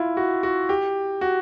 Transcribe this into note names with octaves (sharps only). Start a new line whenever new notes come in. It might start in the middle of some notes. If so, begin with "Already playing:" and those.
Already playing: E4 F4
F#4
F#4
G4
F#4